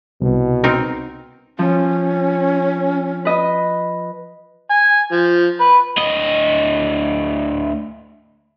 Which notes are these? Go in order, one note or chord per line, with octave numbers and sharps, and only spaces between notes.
C2 B2
C4 D#4 A#4
F3 C#4
B4 D#5
G#5
F3
B4
D2 D#5